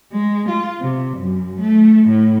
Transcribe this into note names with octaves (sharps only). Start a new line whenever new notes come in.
G#3
F4
C3
F#2
A3
A2